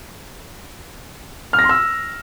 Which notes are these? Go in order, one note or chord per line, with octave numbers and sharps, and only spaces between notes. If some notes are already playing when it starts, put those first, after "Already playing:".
F6
A#6
C6
E6